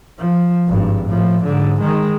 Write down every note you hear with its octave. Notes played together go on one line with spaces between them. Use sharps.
F3
G#1 G2
A2 F3
G#2 D3
D#3 G#3